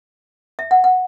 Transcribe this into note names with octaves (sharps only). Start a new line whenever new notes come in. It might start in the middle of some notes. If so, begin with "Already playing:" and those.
E5
F#5
F#5